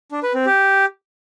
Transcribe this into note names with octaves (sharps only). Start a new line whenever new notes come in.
D4
B4
C4
G4